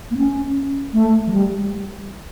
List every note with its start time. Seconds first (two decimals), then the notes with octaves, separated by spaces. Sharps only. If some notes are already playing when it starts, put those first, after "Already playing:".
0.11 A#3
0.17 C#4
0.93 A3
1.26 F3
1.31 G3